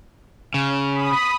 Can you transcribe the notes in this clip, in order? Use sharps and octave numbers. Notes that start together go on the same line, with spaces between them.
C#3
B5 D#6